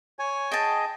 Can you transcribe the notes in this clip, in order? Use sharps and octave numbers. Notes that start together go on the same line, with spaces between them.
C#5 G#5
G#4 D#5 G5 A5